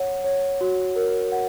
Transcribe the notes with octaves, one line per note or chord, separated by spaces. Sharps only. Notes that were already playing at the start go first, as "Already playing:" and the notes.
Already playing: C#5 F#5
C#5
F#4
A#4
F#5